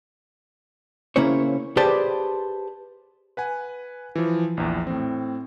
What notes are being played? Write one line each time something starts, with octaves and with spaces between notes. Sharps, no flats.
C#3 A#3 C#4 E4 C5 C#5
G4 G#4 B4 C5 D5 A5
B4 F#5 G#5
E3 F3
A#1 E2
A2 C4